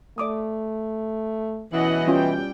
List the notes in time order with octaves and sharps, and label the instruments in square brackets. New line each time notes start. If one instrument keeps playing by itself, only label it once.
[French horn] A3 [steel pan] D5 D6 D#6
[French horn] B2 [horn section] E3 [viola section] C#4 D#5 F#5
[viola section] G3 G5 [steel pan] C#4 F4